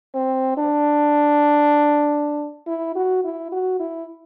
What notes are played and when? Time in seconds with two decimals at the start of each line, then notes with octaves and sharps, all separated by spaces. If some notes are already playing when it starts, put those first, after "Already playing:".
0.15 C4
0.58 D4
2.67 E4
2.96 F#4
3.24 E4
3.52 F#4
3.80 E4